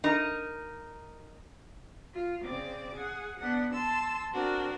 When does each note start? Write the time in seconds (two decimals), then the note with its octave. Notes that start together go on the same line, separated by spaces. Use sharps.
0.04 D#4 A#4
2.13 F4
2.43 C#3 C4 D5 D6
2.93 G#4 F#5
3.38 B3 D4 F#5
3.72 A5 C6 E6
4.32 C4 D4 F#4 A#4